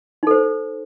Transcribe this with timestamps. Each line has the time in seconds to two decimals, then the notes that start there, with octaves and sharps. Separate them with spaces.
0.23 D#4
0.27 A4
0.31 C5